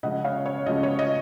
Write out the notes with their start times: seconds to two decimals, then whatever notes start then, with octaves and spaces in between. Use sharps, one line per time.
0.03 C#3 F3 G#3 C#4 D#5 F#5
0.25 C#5 F5
0.46 C#5
0.66 C#3 F3 G#3 C#4 D#5
0.83 C#5
0.99 D#5